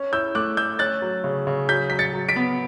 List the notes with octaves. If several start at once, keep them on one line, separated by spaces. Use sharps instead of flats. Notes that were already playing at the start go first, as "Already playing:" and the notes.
Already playing: C#4
E4 E6 G6
A3 D6 F#6
A3 E6 G6
C#4 F#6 A6
F#3
C#3
C#3
F#3 G6 B6
F#3 B6
A6 C#7
F#3
B6 D7
B3